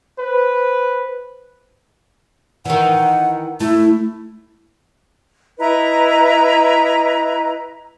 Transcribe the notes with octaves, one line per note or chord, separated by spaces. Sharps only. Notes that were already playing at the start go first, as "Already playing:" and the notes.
B4 C5
D#3 E3 F#5
A3 E4
E4 B4 D#5 A#5